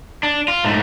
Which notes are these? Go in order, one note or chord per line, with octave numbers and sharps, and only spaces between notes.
D4
F4
G#2 A3